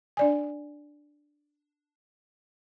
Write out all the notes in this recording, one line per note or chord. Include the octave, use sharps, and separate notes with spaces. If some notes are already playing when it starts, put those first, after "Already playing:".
D4 D5 G#5